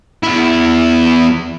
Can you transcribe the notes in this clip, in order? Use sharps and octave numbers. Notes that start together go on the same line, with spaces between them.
E2 E4